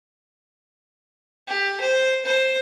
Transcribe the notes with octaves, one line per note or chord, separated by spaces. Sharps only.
G4
C5
C5